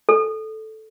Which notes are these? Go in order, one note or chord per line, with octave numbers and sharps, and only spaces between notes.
A4